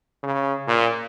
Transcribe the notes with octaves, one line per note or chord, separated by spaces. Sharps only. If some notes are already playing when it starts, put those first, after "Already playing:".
C#3
A#2